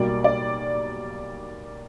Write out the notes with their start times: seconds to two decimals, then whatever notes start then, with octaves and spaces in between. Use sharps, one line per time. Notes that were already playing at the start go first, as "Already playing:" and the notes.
Already playing: B1 B2 G3 A#3 D5
0.24 D5